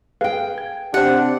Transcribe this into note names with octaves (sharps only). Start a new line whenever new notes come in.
G#4 B4 F5 G5
G#6
C3 C4 D4 G4 C5 F#5